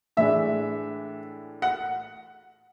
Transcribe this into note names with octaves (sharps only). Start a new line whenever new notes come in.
A2 E3 G#3 D4 E5
F#5